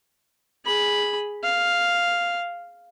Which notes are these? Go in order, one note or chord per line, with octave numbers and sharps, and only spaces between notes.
G#4 B5
F5